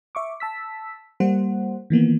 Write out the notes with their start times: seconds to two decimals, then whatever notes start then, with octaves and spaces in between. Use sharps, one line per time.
0.15 E5 C#6 D6
0.40 A5 E6 B6
1.20 G3 A#3 C5 F#5
1.90 D#3 E3 A#3 B3